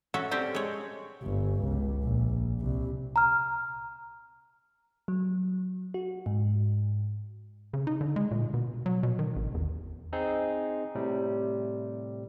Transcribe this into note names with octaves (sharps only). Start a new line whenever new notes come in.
C#4 F#4 A4 E5
G3 C4 G4 A4
G#3 C#5
G1
C#2
A#1
C2
A#5 F6
F#3
F#4
G#2
C#3
D#4
D3
G#3
A#2
B2
F#3
B2
D#3
A1
E2
C4 D#4 G#4
A2 C3 G3